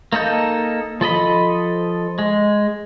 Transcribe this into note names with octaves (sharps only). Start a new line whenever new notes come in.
A#3 D#4 A4 G6
F3 A4 D#5 B5
G#3